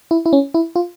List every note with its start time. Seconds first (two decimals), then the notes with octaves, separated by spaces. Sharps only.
0.11 E4
0.26 E4
0.33 C#4
0.54 E4
0.76 F4